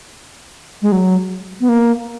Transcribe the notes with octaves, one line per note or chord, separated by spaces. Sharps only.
G#3
F#3
B3
A#3